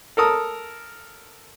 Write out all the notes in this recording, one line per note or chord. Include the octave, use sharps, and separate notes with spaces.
A4 A#4 D#6